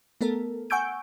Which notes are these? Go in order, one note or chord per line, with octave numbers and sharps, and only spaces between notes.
A3 B3 A4 A#4
F#5 G#5 C#6 E6 G6 D7